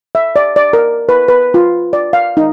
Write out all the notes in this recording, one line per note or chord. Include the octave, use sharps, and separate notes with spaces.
E5
D5
D5
A#4
B4
B4
F4
D5
F5
D#4